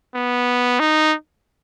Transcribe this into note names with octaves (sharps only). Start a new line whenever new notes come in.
B3
D#4